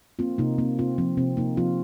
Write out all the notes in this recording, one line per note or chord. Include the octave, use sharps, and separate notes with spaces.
A#3 C4 F4
C3 A#3 D#4
A#3 C4
C3 C4 F4
F3 C4
C3 C4
C3 A#3 D#4
F3 C4 F4